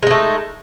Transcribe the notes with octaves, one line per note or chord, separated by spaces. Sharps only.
G#3 A3 D#4